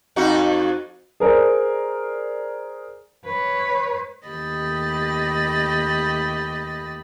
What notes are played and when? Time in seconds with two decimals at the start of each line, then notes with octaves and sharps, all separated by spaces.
0.16 F2 D#4 F#4
1.20 G#4 A#4 C5 D5
3.26 B4 C#5
4.28 D#2 A3 G4 D#5 B5 A6